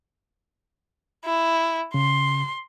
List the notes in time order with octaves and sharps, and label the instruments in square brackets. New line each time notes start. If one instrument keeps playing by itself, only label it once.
[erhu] E4
[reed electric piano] C#3 [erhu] C6